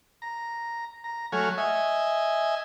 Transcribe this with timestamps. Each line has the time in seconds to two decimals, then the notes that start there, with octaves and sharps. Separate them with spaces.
0.22 A#5
1.04 A#5
1.32 F#3 A3 C#5 F#5 G#5 F6
1.58 D#5 E5 G#5